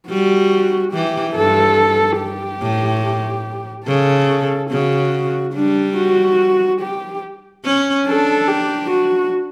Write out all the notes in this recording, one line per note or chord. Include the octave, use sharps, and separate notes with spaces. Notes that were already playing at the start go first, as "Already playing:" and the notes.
G3 F#4
E3 G4
G2 A4
G4
A2
C#3 A4
C#3 F#4
G3 D4
F#4
G4
C#4
D4 A4
G4
F#4